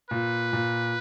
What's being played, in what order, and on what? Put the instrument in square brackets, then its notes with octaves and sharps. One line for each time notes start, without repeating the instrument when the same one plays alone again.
[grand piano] A#2 [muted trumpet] B4
[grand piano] A#2